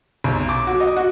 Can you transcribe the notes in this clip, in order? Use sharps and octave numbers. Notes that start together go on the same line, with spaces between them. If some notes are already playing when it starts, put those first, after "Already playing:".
B1
D6
F#4
D#5
F#4